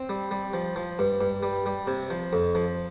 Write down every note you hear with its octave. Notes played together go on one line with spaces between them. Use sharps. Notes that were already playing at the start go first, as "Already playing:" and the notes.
Already playing: C4
G3
G3
F3
F3
G2
G2
G3
G3
C3
F3
F2
F3